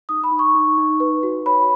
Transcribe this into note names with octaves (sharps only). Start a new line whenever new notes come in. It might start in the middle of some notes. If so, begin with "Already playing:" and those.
D#4 D#6
B5
D#4
C#6
D#4
D#4
B4
F#4
C#5 B5